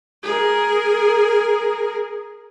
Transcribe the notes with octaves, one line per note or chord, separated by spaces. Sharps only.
G#4 A#4